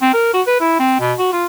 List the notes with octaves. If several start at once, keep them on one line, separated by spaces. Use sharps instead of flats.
C4
A#4
F#4
B4
E4
C4
B2
F#4
F4